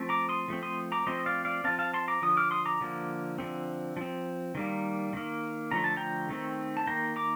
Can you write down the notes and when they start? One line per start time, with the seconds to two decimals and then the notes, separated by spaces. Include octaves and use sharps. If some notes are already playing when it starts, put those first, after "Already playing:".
Already playing: F3 A3 C4
0.09 A#5 D6
0.29 C6 D#6
0.48 F3 A3 C4
0.63 C6 D#6
0.92 A#5 D6
1.06 F3 A3 C4 C5 D#5
1.26 D5 F5
1.45 D5 F5
1.64 F3 C4 F5 A5
1.79 F5 A5
1.94 A5 C6
2.08 A#5 D6
2.22 D3 F3 D#6
2.37 D6 F6
2.51 C6 D#6
2.66 A#5 D6
2.81 D3 F3 A#3
3.38 D3 F3 A3 C4
3.97 F3 C4
4.55 D#3 G3 A#3
5.13 D#3 A#3
5.71 D3 F3 A3 A#5
5.84 A5
5.97 G5 A#5
6.29 D#3 A3 C4
6.77 A5
6.87 D#3 A#3 G5 A#5
7.16 A#5 D6